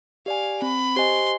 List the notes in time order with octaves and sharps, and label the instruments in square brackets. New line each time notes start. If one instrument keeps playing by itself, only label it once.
[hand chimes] G4 D5 G#5 [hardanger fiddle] F5
[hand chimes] C4 [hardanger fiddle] B5
[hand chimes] G4 C5 D#5 G#5 [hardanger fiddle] C6